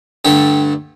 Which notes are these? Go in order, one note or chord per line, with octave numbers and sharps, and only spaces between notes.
G2 D3 A3 G4